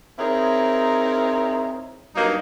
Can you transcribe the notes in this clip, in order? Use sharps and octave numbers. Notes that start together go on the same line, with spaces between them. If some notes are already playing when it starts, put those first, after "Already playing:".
C4 D#4 E4 G#4 A#4 C#5
G2 F#3 A#3 D#4